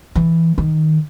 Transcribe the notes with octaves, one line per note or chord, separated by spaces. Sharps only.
E3
D#3